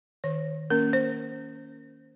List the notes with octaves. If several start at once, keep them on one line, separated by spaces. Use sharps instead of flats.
D#3 C#5
A#3 C#4 A#4
C5